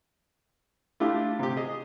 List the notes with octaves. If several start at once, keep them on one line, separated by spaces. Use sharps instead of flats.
A3 D4 E4 F4 G4
C3 G4
G#4 D#5